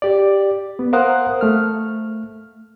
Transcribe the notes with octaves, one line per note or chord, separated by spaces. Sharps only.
G4 D5
B3
A#4 C5 F5 F#5 D#6 F#6
A3 F6